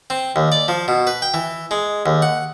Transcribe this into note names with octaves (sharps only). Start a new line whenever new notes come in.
C4
D#2
D5
F3
B2
B4
G5
E3
G#3
D#2
F#5